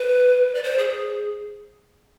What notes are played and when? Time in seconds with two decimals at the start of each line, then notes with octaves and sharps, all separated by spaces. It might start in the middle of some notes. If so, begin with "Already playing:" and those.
Already playing: B4
0.55 D5
0.64 C5
0.79 G#4